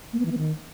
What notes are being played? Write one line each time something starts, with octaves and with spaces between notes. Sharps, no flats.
A#3
B3
E3
B3
D#3